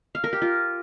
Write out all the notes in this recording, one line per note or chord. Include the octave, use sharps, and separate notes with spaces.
F5
A#4
G4
F4